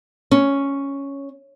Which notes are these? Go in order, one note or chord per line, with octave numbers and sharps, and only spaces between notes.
C#4